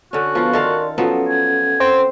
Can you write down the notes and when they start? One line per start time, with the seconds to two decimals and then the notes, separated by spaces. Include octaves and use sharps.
0.13 D3 C#4 F#4
0.35 F3 B3 F4 B4 F5
0.53 D#3 A4 A#4 D5 F5 C6
0.98 F3 F#3 B3 C#4 A4 F#5
1.29 G#5
1.80 C4